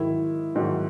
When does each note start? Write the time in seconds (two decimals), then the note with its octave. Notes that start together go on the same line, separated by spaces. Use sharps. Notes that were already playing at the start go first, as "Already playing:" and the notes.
Already playing: G#2 D#3 F#3 E4
0.55 G#2 D#3 F#3